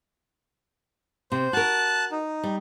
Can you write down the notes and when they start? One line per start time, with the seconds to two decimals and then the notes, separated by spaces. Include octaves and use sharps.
1.32 C3 C5
1.53 F#4 A#4 A5 F#6
2.12 D#4
2.44 G3